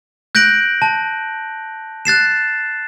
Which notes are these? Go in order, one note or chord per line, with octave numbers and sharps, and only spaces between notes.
F#6 G6 A#6 D7 F#7
A5
F#6 A6 C7 E7